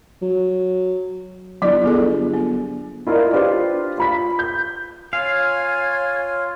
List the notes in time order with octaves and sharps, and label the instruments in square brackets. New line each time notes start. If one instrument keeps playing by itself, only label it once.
[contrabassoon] F#3
[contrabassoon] G1 [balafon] F#3 E4 D5
[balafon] B3 G#4 A4
B3
[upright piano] E4 F4 A#4 D5 D#5
D4 F4 G4 B4 C5
F4 B5 B6
G6
[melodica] F4 [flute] C#5 [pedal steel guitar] F5 [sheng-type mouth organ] G#5